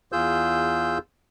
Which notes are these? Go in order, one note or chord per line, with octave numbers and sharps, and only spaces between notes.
E2 F4 G#4 E6 G6